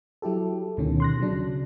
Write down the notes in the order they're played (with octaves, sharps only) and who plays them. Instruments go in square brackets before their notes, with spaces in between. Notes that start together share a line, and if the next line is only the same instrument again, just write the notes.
[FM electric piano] F#3 E4 G4 A4
D2 B2 D#3 C#4
C6 F#6 A#6
C#3 F#3 D4